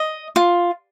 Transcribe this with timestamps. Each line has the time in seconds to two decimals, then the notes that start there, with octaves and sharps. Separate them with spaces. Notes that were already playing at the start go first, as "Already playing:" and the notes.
Already playing: D#5
0.36 F4